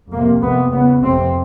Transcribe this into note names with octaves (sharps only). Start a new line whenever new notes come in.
F2 C3 A#3
F2 C3 B3
E2 C#3 B3
F2 C3 C4